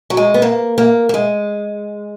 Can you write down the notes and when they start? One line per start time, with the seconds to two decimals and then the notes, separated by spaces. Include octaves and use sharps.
0.10 F#3
0.17 G#3
0.34 B3
0.42 A#3
0.78 A#3
1.09 A#3
1.14 G#3